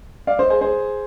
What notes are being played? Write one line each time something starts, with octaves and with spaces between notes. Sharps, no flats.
D5 F5
C5 D#5
G#4 C5
G#4 C5